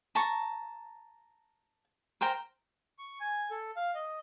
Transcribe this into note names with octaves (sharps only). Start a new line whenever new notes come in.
A5 A#5 C#6
A#4 C5 G5 A#5
C#6
G#5
A4
F5
D#5